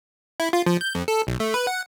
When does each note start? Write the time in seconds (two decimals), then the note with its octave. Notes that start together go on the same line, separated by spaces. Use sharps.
0.40 E4
0.53 F4
0.66 F3
0.81 G6
0.95 F2
1.08 A4
1.27 B1
1.40 A3
1.54 B4
1.67 F#5